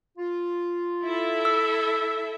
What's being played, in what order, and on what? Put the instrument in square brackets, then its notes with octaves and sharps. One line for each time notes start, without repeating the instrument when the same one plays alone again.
[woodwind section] F4
[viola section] E4 A4 E5
[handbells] E6